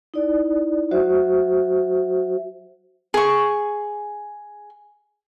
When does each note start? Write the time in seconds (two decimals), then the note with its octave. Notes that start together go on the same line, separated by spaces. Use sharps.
0.14 D#4 E4 D5
0.91 F#3 F#4 C5 E5
3.14 G#4 C#6